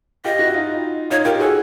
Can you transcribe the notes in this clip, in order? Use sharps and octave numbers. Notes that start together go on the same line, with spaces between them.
F4 G4 D#5
E4 F#4
D#4 F4
D#4 F4 C#5
F4 G4 A#4
F#4 G#4 A4